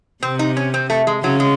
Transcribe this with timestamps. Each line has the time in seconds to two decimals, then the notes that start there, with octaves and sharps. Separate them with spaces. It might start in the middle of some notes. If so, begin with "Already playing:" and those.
0.23 C3 C4
0.39 D#4
0.57 C#4
0.74 C4
0.90 A3
1.07 G#3
1.23 C#3 F#3
1.40 G#3